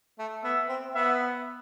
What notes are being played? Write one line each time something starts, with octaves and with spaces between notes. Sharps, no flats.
A3
B3 E5
C4
B3 E5